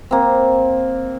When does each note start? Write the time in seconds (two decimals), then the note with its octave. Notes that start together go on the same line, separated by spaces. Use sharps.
0.11 A#3 C4